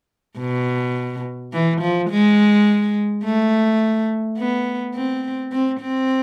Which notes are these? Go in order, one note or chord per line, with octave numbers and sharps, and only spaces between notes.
B2
E3
F3
G#3
A3
B3
C4
C4
C4